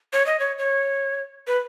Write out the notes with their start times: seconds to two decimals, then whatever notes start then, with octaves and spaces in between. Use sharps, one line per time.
0.13 C#5
0.26 D#5
0.39 C#5
0.58 C#5
1.47 B4